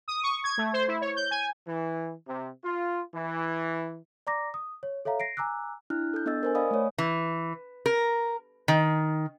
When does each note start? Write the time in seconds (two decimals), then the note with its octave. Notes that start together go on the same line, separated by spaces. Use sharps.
0.08 D#6
0.23 C#6
0.44 G#6
0.58 A3
0.73 C5
0.88 E4
1.01 C#5
1.16 G6
1.31 G#5
1.66 E3
2.26 C3
2.63 F4
3.14 E3
4.27 D5 A#5 D6 A#6
4.54 D#6
4.83 C#5
5.05 A4 C#5 E5 F5 A#5
5.20 A#6 C7 D7
5.37 G#5 A#5 D6 E6 F#6
5.90 D4 E4 F6 F#6
6.14 A4 G6
6.26 B3 D4 A4 D#5 E6 A6
6.43 A#4 C5 G#5
6.55 D5 D#5 F5 G#5 B5 D#6
6.71 A3 C#5
6.98 E3
7.86 A#4
8.68 D#3